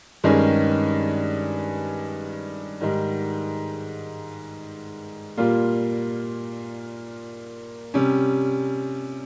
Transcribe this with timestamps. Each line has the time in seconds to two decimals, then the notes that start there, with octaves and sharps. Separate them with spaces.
0.24 G2 D#3 G#3 C#4 G#4
2.80 G#2 D#3 G3
5.37 A#2 G3 A#3 F4
7.94 C3 G3 C#4